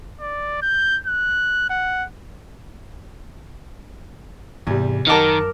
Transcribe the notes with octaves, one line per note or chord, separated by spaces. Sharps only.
D5
G6
F#6
F#5
E2 G#2 C3 G3
F#2 D#3 D#4 A#4 F#5 A5 D6 F6